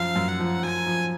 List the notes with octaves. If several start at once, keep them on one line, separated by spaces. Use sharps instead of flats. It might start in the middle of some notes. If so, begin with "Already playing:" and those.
Already playing: F#2 F3 F5
F#2
F#5
F3
F3 G#5
F3